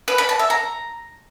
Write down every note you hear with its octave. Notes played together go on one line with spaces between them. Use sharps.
B4
B5
A5
E5
A#5